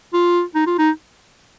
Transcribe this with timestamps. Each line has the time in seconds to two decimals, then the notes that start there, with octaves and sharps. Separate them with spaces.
0.13 F4
0.55 D#4
0.66 F4
0.78 D#4